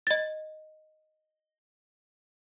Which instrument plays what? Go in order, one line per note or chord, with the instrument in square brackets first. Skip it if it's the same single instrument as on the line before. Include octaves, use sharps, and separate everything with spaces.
[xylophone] D#5 A6